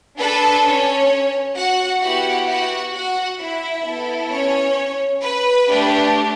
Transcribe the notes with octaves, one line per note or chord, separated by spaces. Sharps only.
D4 A4 B4
C#4 C#5
F#4 F#5
B3 E4 F#4 G4 F#5
F#4 F#5
F#4 F#5
E4 E5
B3 E4 A4
C#4 C#5
B4
A3 D4 G4